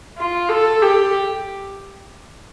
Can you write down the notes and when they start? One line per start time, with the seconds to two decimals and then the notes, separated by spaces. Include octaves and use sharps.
0.18 F4
0.49 A4
0.82 G4